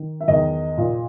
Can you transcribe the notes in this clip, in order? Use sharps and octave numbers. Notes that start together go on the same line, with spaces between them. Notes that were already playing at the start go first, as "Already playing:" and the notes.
Already playing: D#3
E5
E2 D#3 D#5
A#2